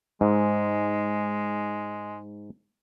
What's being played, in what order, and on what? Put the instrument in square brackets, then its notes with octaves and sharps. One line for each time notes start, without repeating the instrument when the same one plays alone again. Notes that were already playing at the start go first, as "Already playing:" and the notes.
[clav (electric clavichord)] G#2 [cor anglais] G#3